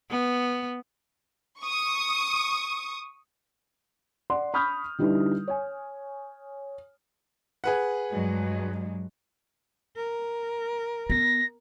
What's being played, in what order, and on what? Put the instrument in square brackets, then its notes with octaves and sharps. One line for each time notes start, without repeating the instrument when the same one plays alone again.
[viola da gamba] B3
[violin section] C#6 D#6
[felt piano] D5 F#5 C6
B5 C#6 D#6 F6 G6
D3 G3 D#4 E4 B4
C#5 G#5
[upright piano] G#4 B4 F#5
[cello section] G2 F#3 G#3
[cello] A#4
[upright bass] B3 [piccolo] A#6